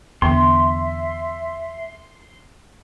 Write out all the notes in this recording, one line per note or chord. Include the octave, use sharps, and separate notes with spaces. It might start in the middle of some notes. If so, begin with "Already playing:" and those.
E2 D3 B3 E5 C6